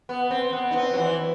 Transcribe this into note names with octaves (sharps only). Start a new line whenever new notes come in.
B3
C4
B3
D#4
C4
F#3
E3